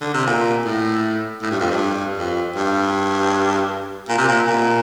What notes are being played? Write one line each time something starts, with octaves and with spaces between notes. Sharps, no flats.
D3
C3
A#2
A2
A2
G2
F2
G2
F2
G2
A#2
C3
A#2
A#2